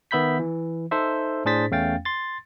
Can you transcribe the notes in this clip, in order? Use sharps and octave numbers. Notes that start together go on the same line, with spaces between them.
D#3 B3 E5 B5 G6 B6
E3
D#4 A4 C5 E5
A2 D4 G#4 C5 A6 B6
E2 A3 C#4 F5 G5 A6
C6 A6